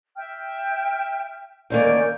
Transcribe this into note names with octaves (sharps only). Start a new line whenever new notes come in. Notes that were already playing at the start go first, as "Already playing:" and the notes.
E5 G5 F6
D2 D#3 A#3 C#4 D5 G6